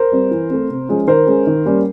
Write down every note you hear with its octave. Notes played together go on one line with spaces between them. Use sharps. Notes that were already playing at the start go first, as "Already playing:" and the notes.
Already playing: A#4 C5
G3 C4
E3
A3 C4
C3
F3 G#3 C#4
D#3 A#4 C5
G#3 C#4
D#3
G3 A#3 C#4